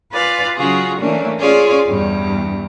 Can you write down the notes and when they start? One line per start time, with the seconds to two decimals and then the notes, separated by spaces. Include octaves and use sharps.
0.12 F4 B4 D5 F5 G#5
0.55 C#3 F#3 F4 F#4 G#4
0.98 E3 A3 A#3 C#4 D4
1.39 C#4 F4 G#4 C#5 D5
1.86 E2 G2 G3